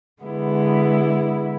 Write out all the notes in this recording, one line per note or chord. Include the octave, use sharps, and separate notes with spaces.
D3 G#3 B3 E4